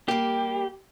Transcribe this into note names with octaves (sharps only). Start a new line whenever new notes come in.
G3 A#3 G4